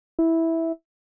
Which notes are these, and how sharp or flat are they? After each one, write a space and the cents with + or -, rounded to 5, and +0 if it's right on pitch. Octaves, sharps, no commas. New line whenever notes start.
E4 -10